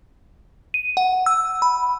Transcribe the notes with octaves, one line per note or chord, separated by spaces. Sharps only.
D#7
F#5
E6
B5